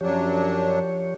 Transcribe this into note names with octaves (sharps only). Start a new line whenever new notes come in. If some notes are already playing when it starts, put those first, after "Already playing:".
F#2 F3 F#3 D4 G4 C#5